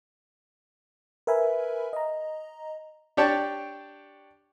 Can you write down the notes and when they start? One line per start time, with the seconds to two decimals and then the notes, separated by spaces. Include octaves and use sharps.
1.27 A#4 B4 E5 G#5 B5
1.93 D#5 A#5
3.17 D4 G4 C#5 G5 A5